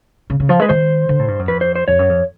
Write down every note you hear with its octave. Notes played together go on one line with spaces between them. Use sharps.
C#3
C#3
F3
G#3 B4
D#3 C5
D3
A2
G2
F#2
F2 B4
C5
C5
F2 C#5
F#2
F2